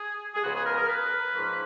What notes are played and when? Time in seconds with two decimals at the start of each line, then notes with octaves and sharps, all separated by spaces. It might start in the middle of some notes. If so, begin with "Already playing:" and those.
Already playing: G#4
0.35 G#4
0.43 C#2 C#3 F3 B3 F#4
0.55 G#4
0.66 A#4
0.78 A#4
0.89 B4
1.34 G#2 F3 A#3 C#4